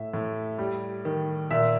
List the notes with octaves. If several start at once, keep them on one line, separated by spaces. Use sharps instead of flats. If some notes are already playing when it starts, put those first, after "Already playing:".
Already playing: A2 E5
A2
G3
D#3
A#2 E5